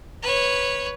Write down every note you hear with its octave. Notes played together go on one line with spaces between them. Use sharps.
B4 C#5